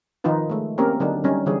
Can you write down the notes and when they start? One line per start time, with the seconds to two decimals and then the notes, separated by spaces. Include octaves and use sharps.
0.24 D#3 F3 D#4 F4 B4
0.50 G#3 A3
0.78 A#3 C4 C#4 G4 A#4
1.00 D3 F#3 D4 D#4
1.24 G3 C#4 D#4
1.46 D3 E3 G3 G#4 C#5